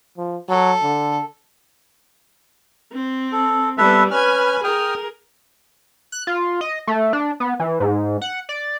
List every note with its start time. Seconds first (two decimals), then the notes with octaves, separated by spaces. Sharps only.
0.18 F3
0.49 F#3 A4
0.83 D3
2.92 C4
3.32 A4
3.78 G3 B3 A4 B4 E5
4.11 C#4 B4 G#5 F6
4.64 G#4 A#4 G5 D#6 F6
6.12 F#6
6.27 F4
6.61 D#5
6.87 A3
7.13 D4
7.40 B3
7.60 E3
7.80 G#2
8.21 F#5
8.49 D5